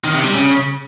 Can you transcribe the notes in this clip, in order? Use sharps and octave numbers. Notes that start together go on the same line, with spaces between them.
D#3
C3
G3
C#3